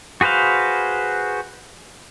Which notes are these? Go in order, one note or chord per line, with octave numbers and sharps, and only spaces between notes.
F#4 G#4 B4 C5 F5